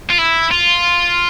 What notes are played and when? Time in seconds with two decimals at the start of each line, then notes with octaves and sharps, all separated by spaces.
0.10 F4
0.18 E4
0.51 F4